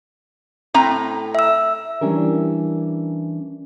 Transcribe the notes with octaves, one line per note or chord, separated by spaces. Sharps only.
A2 C4 A#5
E5 E6
E3 F3 G3 C#4 D4 A#4